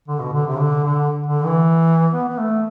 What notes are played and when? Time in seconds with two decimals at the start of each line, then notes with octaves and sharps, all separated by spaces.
0.08 D3
0.20 B2
0.33 D3
0.47 C3
0.59 D3
0.84 D3
1.27 D3
1.45 E3
2.13 B3
2.29 B3
2.38 A3